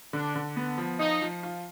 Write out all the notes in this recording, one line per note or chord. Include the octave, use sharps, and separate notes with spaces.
D3 D4
D3
B3
F3
D#4 F4
F3
F4